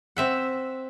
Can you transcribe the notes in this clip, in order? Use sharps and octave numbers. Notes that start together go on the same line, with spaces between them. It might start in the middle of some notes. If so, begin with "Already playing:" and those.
C4 E5 F#5